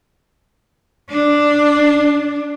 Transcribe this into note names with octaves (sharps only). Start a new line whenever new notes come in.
D4